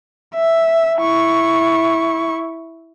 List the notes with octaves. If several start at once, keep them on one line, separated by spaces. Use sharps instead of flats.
E5
E4 C#6